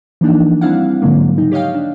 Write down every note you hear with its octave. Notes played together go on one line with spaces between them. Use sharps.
E3 F3 A#3 D4 D#4
G3 C4 D4 E4 F5 F#5
G#2 D3 F3 F#3 G#3 A#3
C#3 D#4
G4 C#5 D#5 F5 G5
D4